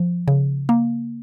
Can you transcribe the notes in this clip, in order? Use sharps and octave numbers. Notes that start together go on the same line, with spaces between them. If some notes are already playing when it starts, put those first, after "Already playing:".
Already playing: F3
C#3
A#3